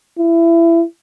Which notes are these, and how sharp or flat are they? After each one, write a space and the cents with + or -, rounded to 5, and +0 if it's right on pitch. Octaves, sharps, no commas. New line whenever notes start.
E4 +25